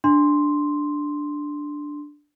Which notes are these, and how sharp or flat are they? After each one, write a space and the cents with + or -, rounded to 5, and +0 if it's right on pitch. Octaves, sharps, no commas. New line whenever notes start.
D4 +0 C6 +0